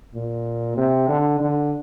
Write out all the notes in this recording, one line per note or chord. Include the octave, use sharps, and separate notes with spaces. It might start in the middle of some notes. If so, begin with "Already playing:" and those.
A#2
C3
D3
D3